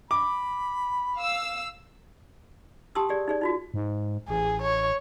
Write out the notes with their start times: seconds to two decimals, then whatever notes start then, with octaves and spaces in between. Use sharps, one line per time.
0.11 B5 D6
1.17 F5 E6
2.95 G4 G5 A5 C6 D#6 E6
3.09 G4 G#4 D5
3.28 D#4 G#4 D5
3.41 D#4 F4 F#4
3.74 G#2
4.28 A1 G#4
4.62 C#5